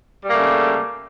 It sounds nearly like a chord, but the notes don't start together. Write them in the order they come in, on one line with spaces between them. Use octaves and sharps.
G3 A#3 A3 C#3